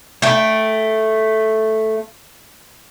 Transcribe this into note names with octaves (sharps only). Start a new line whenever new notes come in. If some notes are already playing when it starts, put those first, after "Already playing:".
A3 G5